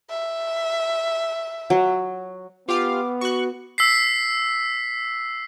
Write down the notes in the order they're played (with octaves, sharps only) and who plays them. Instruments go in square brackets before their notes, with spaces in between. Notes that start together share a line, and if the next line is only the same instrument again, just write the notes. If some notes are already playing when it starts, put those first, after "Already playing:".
[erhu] E5
[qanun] F#3
[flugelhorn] B3 [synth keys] F4 G4 F5 [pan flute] D6
[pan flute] F#4 [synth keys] C#6 F#6
[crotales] E6 B6 C7